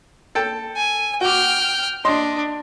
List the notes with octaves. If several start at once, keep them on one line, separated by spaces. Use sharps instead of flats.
A4 G5 A5
G#5
F#4 G5 D6 F6
D4 D#5 C6